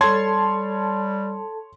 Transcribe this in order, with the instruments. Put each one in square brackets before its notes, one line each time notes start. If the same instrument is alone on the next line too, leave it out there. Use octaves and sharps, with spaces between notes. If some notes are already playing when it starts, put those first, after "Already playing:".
[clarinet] G3 [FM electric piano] A4 A5 [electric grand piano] C#5 C6 G#6